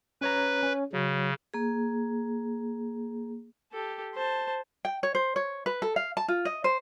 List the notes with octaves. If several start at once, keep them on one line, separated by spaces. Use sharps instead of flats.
C#4 B4 C#5 A#5
C#4 C#5
C#3 F#3
A#3 G#4
G4 A4
C5 A5
G5
C#5
C5
C#5
B4
A4
F5
A5
F4
D#5
C5